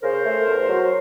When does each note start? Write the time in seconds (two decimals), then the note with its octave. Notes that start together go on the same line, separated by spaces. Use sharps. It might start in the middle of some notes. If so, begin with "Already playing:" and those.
0.03 C#3 A#4 C5
0.26 A3
0.46 E2
0.69 F#3